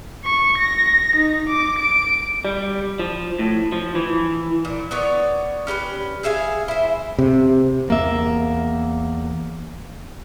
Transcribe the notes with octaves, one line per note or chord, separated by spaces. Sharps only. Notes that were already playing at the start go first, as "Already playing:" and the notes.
C#6
A#6
D#4
D6
D7
G3
F3
A2
F3
E3
A#2
B3 C#5 D5
C#4 G4 A#4 B4
G#4 E5 F5 G#5
E4 C5
C3
E2 A#3 E5